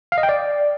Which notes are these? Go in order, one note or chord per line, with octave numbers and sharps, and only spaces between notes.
F5
D#5
G5
D5